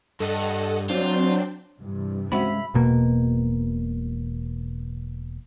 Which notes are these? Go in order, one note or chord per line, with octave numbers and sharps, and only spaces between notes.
G2 A4 D#5 F#5
F#3 C4 D4 F4 G6
G2 C3 E3
G#3 C4 C#4 F#4 E5 B5
E1 B2 A#3